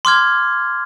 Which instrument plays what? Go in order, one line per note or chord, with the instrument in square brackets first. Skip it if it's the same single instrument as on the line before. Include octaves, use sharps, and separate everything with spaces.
[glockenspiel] C6 D6 F6 G#6